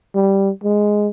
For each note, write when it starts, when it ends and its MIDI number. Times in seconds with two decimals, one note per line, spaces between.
0.15 0.50 55
0.64 1.08 56